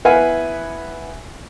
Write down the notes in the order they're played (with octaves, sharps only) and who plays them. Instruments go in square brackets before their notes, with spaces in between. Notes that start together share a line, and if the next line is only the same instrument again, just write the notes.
[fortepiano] B3 E4 B4 F5 F#5 G#5